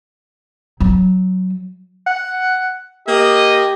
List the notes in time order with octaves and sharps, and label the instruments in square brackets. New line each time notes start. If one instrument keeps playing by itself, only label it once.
[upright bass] F#3
[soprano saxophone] F#5
[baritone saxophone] A#3 [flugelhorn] G4 [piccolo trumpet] D#5